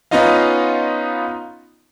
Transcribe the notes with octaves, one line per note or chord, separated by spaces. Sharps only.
B3 C#4 D#4 F4 D#5 F5